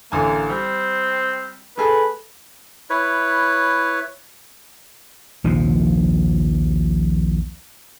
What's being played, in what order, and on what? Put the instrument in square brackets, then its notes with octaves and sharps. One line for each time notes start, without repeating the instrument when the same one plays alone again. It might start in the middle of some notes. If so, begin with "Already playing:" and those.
[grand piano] A1 D3 G#5 [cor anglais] A#3
[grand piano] G3 [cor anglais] C4
[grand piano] A3 G#4 A4 [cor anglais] B4
[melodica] E4 B4 C#5
[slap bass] A#1 D#2 C3 F3